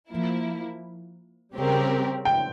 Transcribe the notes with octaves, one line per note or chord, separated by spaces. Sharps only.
F3 A#3 E4
C#3 G3 C4 G4 A#4
G5